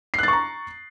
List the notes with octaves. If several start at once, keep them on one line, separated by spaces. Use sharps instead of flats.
A#5 C#6 F#6 A6 C7